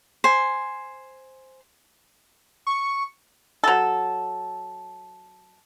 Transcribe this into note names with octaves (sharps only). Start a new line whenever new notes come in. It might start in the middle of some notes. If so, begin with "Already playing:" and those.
C5 G#5
C#6
F#3 A4